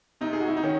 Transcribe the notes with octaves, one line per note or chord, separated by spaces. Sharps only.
C3 D#4
G#4
F#4
E4
D#4
D#3 C#4